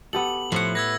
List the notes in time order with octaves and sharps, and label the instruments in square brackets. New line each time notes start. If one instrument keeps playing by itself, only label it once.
[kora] B3 G4 A4 [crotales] F#7
[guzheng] A2 F#5 [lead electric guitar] F3 C5
[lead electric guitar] B4 [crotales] E6 G#6 A#6